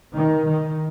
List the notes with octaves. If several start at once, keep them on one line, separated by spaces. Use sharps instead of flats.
D#3
D#3